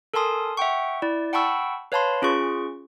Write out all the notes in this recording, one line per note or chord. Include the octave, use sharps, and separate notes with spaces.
A4 A#4 G#5 A5 C6 D#6
E5 F#5 G5 C#6
E4 D5
F#5 G5 A5 B5 C#6 E6
B4 C#5 F5 A5 B5 C6
C#4 F4 G#4 C#6